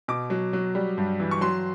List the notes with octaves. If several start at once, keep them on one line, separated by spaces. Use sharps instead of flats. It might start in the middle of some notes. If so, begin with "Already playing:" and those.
B2 D6
F#3
F#3
G3
G2
E3
C#6
F#3 C6